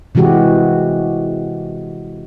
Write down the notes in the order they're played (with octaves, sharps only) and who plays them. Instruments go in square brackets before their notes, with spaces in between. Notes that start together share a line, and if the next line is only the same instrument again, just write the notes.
[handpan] C3 E3 G#3 F#4 G4